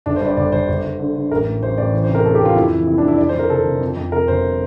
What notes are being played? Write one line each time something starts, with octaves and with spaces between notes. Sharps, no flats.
G1 D4
C5
G2 D5
G1 D5
G1 C5
G1
G1
D3
D3
A1 A#4
A2
A1 C5
A1 D5
E3 C5
C5
C3
A#4
D2 A4
G4
D2 F4
F2 E4
E3
C3 E4
D4
F2
E4
F2 D5
C5
F2 A#4
F1 A4
F1
F2
F2
C3 A#4
G1 C5